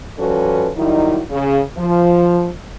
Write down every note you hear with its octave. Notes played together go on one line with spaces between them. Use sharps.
F3 G3 C#4 F#4 A4 B4
D#3 F#3 G3 D#4 E4
C#3
F3